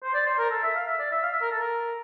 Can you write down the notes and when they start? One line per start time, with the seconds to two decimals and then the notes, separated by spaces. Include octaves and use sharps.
0.03 C5
0.14 D5
0.26 C5
0.38 A#4
0.50 A4
0.63 E5
0.75 F5
0.87 E5
0.99 D5
1.11 E5
1.23 F5
1.32 E5
1.41 A#4
1.50 A4
1.60 A#4